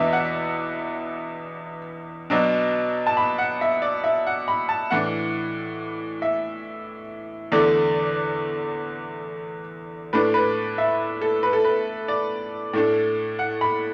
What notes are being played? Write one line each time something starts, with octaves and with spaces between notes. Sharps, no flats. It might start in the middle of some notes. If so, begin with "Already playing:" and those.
Already playing: E2 B2 B3 D4 E5
F#5
B2 F#3 D4
A5
B5
F#5
E5
D5
E5
F#5
B5
A5
A2 E3 D4 F#5
E5
E2 D3 A3 D5
A2 A3 D4 B4
B4
E5
A4
B4
A4
B4
D5
A2 A3 D4
F#5
B5